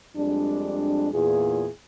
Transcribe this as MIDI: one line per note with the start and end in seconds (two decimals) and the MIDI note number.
0.17 1.09 41
0.17 1.09 55
0.17 1.09 56
0.17 1.09 62
1.13 1.68 40
1.13 1.68 46
1.13 1.68 64
1.13 1.68 65
1.13 1.68 68